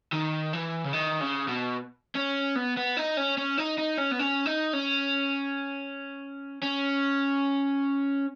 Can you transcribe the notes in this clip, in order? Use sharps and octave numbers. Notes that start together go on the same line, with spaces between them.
D#3
E3
C#3
D#3
C#3
B2
C#4
B3
B3
D#4
C#4
C#4
D#4
D#4
C#4
B3
C#4
D#4
C#4
C#4